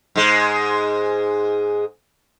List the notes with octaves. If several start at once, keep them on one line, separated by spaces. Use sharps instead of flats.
G#2 G#3